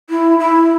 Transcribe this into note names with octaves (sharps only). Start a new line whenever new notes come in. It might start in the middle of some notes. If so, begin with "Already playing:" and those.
E4
E4